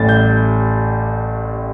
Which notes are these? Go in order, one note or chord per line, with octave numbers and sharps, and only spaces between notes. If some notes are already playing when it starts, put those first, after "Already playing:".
Already playing: A1 A2 G3 A6
G6